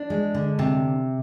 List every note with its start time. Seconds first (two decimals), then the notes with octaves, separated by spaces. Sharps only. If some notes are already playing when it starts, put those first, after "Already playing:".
Already playing: D4
0.10 G#3
0.34 D3
0.59 C3